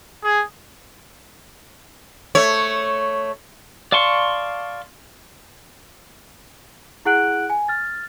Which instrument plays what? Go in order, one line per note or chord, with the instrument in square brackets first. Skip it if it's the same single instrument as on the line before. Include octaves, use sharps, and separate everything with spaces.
[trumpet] G#4
[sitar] A3 C#5
[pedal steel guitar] D5 F5 A5 C6 C#6
[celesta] E4 G#4 F#5 F#6 D7 F#7
G#5
F6 A6